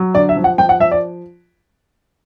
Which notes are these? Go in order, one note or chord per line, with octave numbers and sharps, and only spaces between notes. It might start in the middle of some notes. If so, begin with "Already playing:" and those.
Already playing: F#3
D3 D5
E5
F3
F#5
F3 G5
F#5
F3 E5
D5